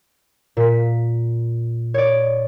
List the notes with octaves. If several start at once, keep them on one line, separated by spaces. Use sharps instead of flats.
A#2 B6
C#5 D5